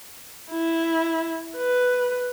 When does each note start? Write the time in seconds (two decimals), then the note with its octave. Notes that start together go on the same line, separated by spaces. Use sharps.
0.51 E4
1.57 B4